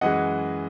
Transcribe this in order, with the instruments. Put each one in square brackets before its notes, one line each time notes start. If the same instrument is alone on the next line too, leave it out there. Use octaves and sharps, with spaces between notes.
[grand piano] F#2 E3 G#3 D#5 F#5